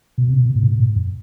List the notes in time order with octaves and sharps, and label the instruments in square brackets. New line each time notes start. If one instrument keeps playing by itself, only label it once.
[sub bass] B2
C3
B2
A2
B2
A2
F#2